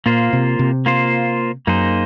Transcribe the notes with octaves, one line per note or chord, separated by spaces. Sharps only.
A#2 A#3 F4 C5
C3
C3
A#3 F4 C5
F#2 A#3 D#4 G#4 C5